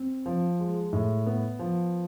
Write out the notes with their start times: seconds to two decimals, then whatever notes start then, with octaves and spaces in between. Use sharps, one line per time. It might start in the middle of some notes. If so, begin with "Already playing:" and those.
Already playing: C4
0.26 F3
0.59 G#3
0.93 A2
1.26 B3
1.59 F3